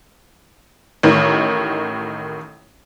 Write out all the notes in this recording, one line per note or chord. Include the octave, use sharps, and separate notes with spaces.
A1 A2 D#3